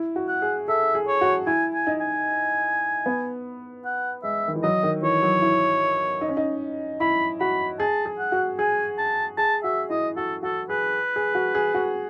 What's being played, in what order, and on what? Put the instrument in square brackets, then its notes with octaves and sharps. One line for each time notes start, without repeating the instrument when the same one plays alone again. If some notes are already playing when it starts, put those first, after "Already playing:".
Already playing: [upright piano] E4
F#4
[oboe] F#5
[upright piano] G#4
[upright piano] A4 [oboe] E5
[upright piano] G#4
[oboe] C#5
[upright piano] F#4
[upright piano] E4 [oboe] G#5
[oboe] G#5
[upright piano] D#4
[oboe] G#5
[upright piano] B3
[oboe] F#5
[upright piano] G#3 [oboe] E5
[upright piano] D#3
E3
[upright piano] F#3 [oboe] D#5
[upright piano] D#3
[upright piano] E3 [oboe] C#5
[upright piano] F#3
E4
D#4
C#4
D#4
[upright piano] E4 [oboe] B5
[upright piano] F#4 [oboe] B5
[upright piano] G#4 [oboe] A5
[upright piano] G#4
[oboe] F#5
[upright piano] F#4
[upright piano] G#4 [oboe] G#5
[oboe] A5
[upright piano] G#4 [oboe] A5
[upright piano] F#4 [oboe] E5
[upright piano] E4 [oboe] D#5
[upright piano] F#4 [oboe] A4
[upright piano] F#4 [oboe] A4
[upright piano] G#4 [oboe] B4
[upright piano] G#4
F#4
G#4
F#4